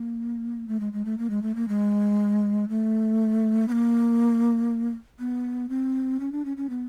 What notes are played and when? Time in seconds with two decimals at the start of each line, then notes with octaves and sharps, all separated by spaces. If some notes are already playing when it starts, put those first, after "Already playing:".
Already playing: A#3
0.68 A3
0.80 G#3
0.93 G#3
1.05 A3
1.18 A#3
1.30 G#3
1.42 A3
1.55 A#3
1.68 G#3
2.69 A3
3.68 B3
3.72 A#3
5.20 B3
5.69 C4
6.20 C#4
6.32 D4
6.45 C#4
6.57 C#4
6.70 B3